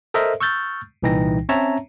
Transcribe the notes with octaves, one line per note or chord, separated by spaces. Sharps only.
A4 A#4 C5 D#5 E5
C#6 E6 F6 G6 A6
C2 A#2 E3 D#4 G5 A#6
C4 C#4 C#5 E5 A5 A#5